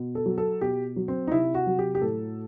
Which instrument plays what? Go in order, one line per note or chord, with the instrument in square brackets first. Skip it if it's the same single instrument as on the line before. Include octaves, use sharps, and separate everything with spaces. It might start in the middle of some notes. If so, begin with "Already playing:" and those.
Already playing: [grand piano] B2
A4
F#3
A4
B2 G4
F#3
C4
D#4
C3 E4
F#4
F#3
G4
G4
A2 A4